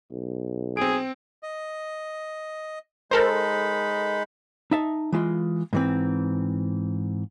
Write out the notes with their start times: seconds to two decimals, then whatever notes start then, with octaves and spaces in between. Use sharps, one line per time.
0.11 B1
0.77 C4 G#4 D7
1.43 D#5
3.11 G#3 D#4 A4 A#4 C5 B5
4.71 D#4 E5 A5
5.12 E3 G#3 F4
5.73 G#2 E3 C4